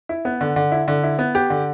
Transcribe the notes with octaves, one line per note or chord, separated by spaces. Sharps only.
E4
B3
D3
D3
E4
D3
E4
B3
G4
D3